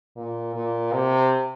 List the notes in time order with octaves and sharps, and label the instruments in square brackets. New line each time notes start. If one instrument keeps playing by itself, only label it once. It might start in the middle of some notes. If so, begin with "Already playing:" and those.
[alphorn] A#2
A#2
C3